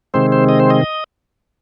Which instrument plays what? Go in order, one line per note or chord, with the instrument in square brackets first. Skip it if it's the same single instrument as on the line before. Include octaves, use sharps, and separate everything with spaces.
[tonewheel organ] C3 D#3 G#3 C4 C5
C5
D#5
C5
D#5